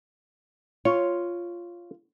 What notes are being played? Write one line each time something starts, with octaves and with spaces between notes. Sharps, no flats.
F4 C#5